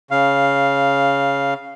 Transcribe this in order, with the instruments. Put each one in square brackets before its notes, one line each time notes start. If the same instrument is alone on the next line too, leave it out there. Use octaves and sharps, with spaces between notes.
[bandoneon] C#3 F5